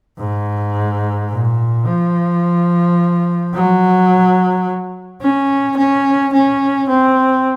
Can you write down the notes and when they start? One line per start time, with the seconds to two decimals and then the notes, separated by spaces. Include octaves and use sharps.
0.19 G#2
1.31 A#2
1.87 F3
3.54 F#3
5.22 C#4
5.77 C#4
6.33 C#4
6.89 C4